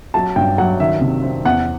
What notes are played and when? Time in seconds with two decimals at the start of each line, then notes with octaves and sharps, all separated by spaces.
0.14 F#3 A5
0.36 G2 G5
0.58 F#3 F#5
0.80 D#3 E5
1.01 C3
1.23 C4
1.45 E2 F#5